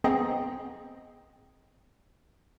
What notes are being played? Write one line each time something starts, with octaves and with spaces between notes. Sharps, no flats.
B3 C4 G#4 D#5 G5 A#5